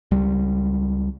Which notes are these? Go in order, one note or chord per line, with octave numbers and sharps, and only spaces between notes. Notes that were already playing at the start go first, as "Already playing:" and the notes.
C#2 G3